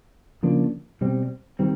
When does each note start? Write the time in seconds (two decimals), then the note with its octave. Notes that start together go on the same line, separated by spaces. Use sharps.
0.43 C#3 F3 A#3 D4
1.01 B2 G3 C4
1.59 D#3 G3 C4